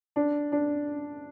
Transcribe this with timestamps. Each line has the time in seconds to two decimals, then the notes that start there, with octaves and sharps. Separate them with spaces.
0.16 D4
0.52 D4